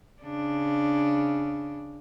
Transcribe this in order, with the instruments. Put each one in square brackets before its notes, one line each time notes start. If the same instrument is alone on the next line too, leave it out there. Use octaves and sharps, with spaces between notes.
[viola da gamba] C#3 D4